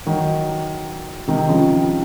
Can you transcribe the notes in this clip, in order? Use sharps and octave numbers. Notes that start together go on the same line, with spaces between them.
D#3 F#3
C3 D#3
C#3 F3